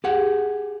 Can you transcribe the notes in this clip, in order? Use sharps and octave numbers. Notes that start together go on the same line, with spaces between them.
G4 G#4 F#5